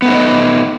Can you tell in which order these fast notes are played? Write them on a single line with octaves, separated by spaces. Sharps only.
B3 A3 D#4 C5 D#5